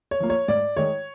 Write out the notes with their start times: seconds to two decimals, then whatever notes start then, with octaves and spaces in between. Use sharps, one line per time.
0.11 C#5
0.20 F3 A#3
0.30 C#5
0.48 G#2 D5
0.77 D#3 G#3 C#5